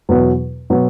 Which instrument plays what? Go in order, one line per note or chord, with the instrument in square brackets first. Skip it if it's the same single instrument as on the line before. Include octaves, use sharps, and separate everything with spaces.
[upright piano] E2 B2 F#3 B3
B2 F#3 B3